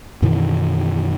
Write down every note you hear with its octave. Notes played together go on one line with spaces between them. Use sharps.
F#2 B2 D#3 E3